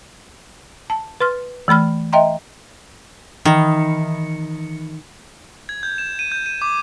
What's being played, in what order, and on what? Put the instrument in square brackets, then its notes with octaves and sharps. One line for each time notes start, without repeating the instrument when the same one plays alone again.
[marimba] A5
B4 C6 F6
E3 A3 B5 F6
D#5 E5 G5 A#5 C6
[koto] D#3 [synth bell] E3 D#4 C#7
[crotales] G#6
G6
E7
D#7
G6
D#7
D6